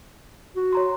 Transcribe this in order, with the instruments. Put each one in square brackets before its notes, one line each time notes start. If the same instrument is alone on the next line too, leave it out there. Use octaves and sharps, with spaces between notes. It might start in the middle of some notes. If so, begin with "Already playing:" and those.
[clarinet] F#4
[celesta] C#5 A#5 C6